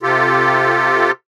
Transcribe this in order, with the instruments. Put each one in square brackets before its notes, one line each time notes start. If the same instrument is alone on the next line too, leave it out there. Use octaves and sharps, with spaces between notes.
[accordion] C3 F4 G4 A4